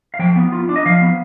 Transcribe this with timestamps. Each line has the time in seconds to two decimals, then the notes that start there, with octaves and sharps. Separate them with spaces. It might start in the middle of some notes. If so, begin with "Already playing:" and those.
0.14 F5
0.19 F3 G5
0.36 B3
0.52 F4
0.69 D4
0.76 D#5
0.86 F3 F5
1.01 B3